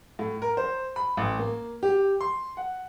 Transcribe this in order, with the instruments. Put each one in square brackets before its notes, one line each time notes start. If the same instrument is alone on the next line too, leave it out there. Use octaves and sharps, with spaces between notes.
[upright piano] A2
A#4
C5
B5
A1
A#3
G4
C6
F#5